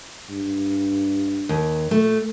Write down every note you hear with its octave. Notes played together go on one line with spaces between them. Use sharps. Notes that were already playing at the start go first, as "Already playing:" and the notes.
G2
D#2
A#2 A3